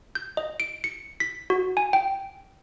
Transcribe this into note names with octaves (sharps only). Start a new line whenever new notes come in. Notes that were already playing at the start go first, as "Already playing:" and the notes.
G6
D#5
D7
C#7
B6
F#4
G#5
G5